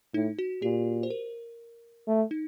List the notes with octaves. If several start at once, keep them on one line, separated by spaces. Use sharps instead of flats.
A2 D#4
F#4
A#2 G4
C5
A#4
A3
D#4